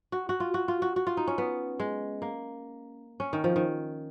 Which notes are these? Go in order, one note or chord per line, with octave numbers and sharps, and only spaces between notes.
F#4
F#4
F4
F#4
F4
F#4
F#4
F4
D#4
C#4
B3
G#3
A#3
C#4
D#3
F3
D#3